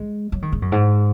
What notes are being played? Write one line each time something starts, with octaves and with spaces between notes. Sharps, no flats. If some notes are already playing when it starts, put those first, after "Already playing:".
Already playing: G#3
F#3
D#3
G#2
F#2
G#2